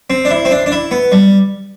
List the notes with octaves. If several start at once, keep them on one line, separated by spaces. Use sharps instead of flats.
C4
D4
E4
C4
D4
D4
E4
B3
G3